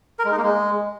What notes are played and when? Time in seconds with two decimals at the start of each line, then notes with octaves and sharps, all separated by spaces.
0.19 A#4
0.25 G#3
0.31 D#4
0.38 A#3
0.44 G#3